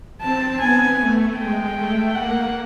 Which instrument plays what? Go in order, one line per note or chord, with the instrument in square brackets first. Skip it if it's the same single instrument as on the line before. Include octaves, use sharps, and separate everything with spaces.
[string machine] C4 [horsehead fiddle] A5
[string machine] B3 [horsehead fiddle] G#5
[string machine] A3
[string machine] G#3 [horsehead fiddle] G5
[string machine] A3
[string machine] A#3 [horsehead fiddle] F#5